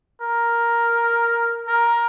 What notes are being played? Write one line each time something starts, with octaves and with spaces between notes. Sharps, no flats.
A#4
A#4